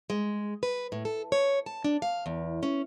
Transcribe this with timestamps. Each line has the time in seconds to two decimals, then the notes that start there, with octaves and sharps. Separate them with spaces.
0.10 G#3
0.63 B4
0.92 A2
1.05 A4
1.32 C#5
1.66 A5
1.84 D4
2.02 F5
2.26 E2
2.63 C#4